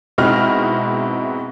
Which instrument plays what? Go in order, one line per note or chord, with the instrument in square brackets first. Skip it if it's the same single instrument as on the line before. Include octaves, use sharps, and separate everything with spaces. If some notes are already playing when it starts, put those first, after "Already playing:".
[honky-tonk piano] G#2 B2 C4 E4 D#5 F6